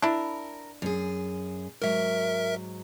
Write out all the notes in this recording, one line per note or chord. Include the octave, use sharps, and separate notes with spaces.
D4 E4 A#4
F#2 G#4
G#2 F#3 A#4 E5